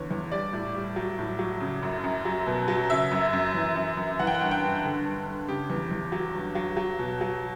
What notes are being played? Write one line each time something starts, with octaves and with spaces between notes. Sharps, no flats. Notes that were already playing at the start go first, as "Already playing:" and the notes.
Already playing: E2 D3 C#5
E2
G3 D5
A2
G3
F#3
A2
F#3
C#3
F#2
F#2
F#3
B2
F#3
C#3 E5
F#2
F#2
E3
F#2
F#2
E3 F#5
G5
F#5
G2
G5
G2
D3
G2
G2
C#3 G4
E2
E2
F#3
G2
F#3
F#3
B2
F#3